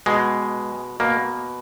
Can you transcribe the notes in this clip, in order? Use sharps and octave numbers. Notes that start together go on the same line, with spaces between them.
B2 G#3
B2 A#3